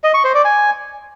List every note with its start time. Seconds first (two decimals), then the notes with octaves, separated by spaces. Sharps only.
0.04 D#5
0.14 C#6
0.24 C5
0.34 D5
0.45 G#5